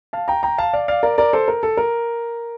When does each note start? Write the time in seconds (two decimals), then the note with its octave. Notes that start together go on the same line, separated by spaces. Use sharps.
0.13 F5 A5
0.28 G5 A#5
0.43 G5 A#5
0.58 F5 A5
0.73 D5 F5
0.88 D5 F5
1.03 A#4 D5
1.18 A#4 D5
1.33 A4 C5
1.48 A#4
1.63 A4
1.77 A#4